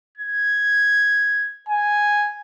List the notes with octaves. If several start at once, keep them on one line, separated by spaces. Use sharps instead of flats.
G#6
G#5